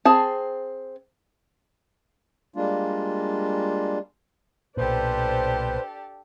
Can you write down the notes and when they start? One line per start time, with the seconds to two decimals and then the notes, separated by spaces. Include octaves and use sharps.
0.05 C4 G#4 A5
2.56 G3 G#3 A#3 D4 F4
4.77 B1 A#2 D4 G4 A4 B4 C5